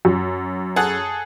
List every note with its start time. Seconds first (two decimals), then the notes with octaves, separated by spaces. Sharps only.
0.05 F#2
0.76 G#4 A4 F#5